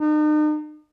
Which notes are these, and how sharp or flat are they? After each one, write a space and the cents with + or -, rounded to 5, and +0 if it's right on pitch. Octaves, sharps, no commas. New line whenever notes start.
D#4 -40